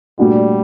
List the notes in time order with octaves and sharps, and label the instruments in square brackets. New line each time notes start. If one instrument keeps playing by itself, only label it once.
[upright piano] A#2 A3 D4 F#4 [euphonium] G3